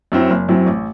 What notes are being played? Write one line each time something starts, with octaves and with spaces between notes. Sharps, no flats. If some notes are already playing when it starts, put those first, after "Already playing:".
F#2 F#3 C4 E4
F#1
F#2 F#3 C4 E4
A1